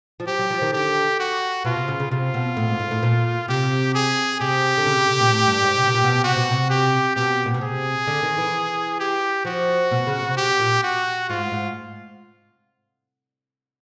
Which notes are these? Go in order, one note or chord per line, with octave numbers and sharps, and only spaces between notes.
F3
F#3 G4
F#3
F3
D#3
D3 G4
F#4
B2 F4
C3
C#3
C#3
C3 F4
B2
A2
G#2
G#2
A2
A#2
C3 G4
G#4
C3 G4
D3
C#3
C#3
C3
A#2
A2
G2
G#2
C3
B2
A#2
B2
C3 F#4
B2
C3
G4
B2 G4
A#2
B2
C3 G#4
D3
D#3
E3
G4
F3 F#4
B2
C#3
C3
G4
A#2
F#4
G#2 F4
G#2